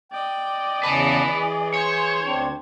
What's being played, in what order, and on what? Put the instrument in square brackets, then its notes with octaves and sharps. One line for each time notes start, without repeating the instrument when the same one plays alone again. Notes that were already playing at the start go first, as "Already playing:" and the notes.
[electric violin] D5 D#5 [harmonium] G5
[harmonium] E2 C#3 A5 [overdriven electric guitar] B4 G#5
[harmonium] E3 G#4
[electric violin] C5 G#6 [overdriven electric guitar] C#5
[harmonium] D2 C4 D4